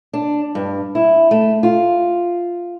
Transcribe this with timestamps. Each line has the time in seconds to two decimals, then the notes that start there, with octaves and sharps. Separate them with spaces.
0.13 D4
0.55 G2
0.95 E4
1.31 A3
1.63 F4